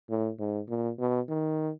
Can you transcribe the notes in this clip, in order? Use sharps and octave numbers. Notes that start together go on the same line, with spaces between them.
A2
G#2
A#2
B2
D#3